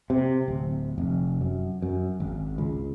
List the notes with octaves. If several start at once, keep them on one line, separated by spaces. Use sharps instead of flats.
C3
D1
F1
F#2
F#2
G#1
C#2